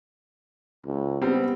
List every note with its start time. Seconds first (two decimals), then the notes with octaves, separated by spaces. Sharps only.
0.86 C#2
1.22 G3 B3 C4